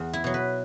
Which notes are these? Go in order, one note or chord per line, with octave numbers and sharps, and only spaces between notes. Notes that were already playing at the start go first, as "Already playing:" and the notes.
Already playing: E2
E4
B2 F#3
B4